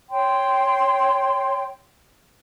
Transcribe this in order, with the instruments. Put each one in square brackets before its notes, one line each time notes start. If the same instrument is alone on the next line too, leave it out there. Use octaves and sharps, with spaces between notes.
[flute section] C#5 G5 C6